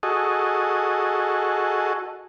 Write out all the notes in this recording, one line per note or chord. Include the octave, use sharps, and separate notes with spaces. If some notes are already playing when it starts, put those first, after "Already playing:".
F#4 G#4 A4 D#5